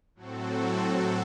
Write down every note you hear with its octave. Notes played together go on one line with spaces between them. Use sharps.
A2 F#3 C4 F#4 A4